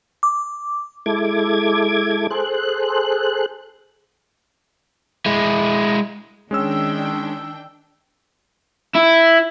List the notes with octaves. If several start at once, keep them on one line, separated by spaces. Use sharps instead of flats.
D6
G#3 E4 A4 D6 G#6
G#4 A4 C5 F#6
G#3 E4
D#3 G#3 C#4 D4 G5 E6
E4